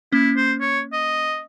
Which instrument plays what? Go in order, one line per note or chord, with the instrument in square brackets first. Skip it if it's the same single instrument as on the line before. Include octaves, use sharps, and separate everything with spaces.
[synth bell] A#3 C#4 [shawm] E4
[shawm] C5
C#5
D#5